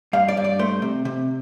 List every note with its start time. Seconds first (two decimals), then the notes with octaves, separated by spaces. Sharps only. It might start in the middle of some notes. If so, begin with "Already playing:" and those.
0.13 G2 F5
0.28 D5
0.37 G2
0.44 D5
0.59 A3 C5
0.82 C3
1.05 C3